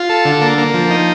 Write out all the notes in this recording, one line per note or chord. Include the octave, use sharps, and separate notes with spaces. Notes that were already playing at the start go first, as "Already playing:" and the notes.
Already playing: F4
A4
D3
A#3
A#3
F3
D#4